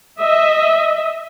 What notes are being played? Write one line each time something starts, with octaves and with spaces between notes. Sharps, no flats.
D#5 E5